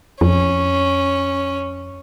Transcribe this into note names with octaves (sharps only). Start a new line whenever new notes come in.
F2 C#4